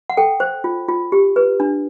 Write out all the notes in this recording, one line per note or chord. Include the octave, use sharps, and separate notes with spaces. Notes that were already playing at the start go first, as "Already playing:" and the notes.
F#5
A4 G5
C5
F4
F4
G4
B4
D4